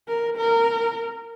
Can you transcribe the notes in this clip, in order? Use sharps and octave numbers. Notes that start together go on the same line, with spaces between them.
A#4
A#4